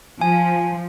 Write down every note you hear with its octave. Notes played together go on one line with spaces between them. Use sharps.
F3 G#5